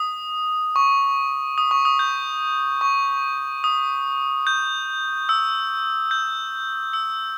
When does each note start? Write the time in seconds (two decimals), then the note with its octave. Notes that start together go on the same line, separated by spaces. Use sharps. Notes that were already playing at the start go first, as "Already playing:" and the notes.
Already playing: D#6
0.76 C#6
1.58 D#6
1.71 C#6
1.85 D#6
1.99 G6
2.81 C#6
3.64 D#6
4.47 G6
5.29 E6
6.11 G6
6.93 E6